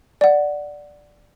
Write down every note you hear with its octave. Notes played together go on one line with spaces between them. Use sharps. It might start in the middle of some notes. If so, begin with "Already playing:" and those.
D5 F#5